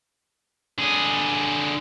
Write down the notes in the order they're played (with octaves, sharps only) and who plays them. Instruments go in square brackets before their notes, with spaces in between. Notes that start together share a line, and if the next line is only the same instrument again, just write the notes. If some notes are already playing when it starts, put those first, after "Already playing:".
[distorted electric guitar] D3 G#4